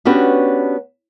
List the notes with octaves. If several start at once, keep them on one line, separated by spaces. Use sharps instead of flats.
B3 C#4 D4 F#4 G4 B4